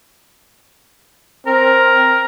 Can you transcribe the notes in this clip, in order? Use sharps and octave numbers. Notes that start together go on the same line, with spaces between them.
C4 A#4